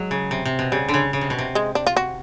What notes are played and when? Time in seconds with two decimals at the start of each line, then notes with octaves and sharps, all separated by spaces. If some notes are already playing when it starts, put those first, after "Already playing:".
Already playing: F#3 G#3
0.11 C#3
0.31 C3
0.45 C3
0.59 B2
0.72 C#3 G3
0.88 D3
0.94 C#3
1.13 C#3
1.21 C3
1.30 B2
1.38 C3
1.55 G#3
1.75 D4
1.87 F4
1.97 F#4